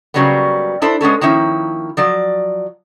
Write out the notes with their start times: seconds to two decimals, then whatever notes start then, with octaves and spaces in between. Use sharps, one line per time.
0.14 C#3 F#3 G3 A#3 B3
0.82 D4 E4 A4 C5
1.01 G#3 B3 C#4 A4
1.21 D#3 F3 A#3 C#4 E4
1.97 F3 F#3 D5